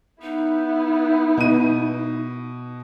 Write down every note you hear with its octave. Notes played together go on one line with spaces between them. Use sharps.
B3 D#4 E4
B2 D#7